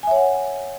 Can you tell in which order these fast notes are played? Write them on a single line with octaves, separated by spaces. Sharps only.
G#5 E5 C#5 F#5